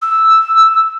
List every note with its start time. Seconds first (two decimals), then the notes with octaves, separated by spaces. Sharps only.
0.02 E6